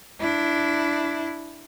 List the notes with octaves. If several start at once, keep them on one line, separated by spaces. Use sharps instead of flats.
D4 E4